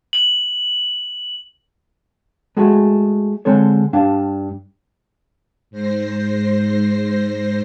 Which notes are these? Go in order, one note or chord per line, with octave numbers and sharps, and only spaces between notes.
F#7
G#3 A3 F#4 G#4
D3 G#3 C4 A4 C#5
G2 D4 F5
G#2 C5 A#6 C7